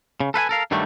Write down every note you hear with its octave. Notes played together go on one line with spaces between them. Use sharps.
C#3
A4 B4 F5 G#5
A4 A#4 F5
G2 D#3 F#3 G3 A3